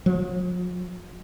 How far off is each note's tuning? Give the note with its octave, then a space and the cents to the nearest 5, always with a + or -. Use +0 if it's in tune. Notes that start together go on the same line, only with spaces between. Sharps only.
F3 +45